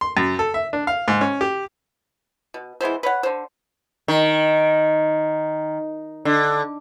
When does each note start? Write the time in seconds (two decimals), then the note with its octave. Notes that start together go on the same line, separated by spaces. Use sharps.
0.01 C6
0.17 F#2
0.39 A4
0.54 E5
0.73 D4
0.87 F5
1.08 G#2
1.21 C#4
1.41 G4
2.54 B2
2.81 E3 G#3 B3 C5
3.03 B4 C#5 F#5
3.23 D3 C5
4.08 D#3
6.25 D3